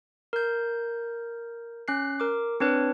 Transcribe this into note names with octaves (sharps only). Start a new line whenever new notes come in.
A#4 G6
C#4 F#6 C7
A#4 D6
C4 D4 B4 C#5